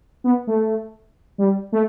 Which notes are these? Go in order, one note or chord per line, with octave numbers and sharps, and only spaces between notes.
B3
A3
G3
A3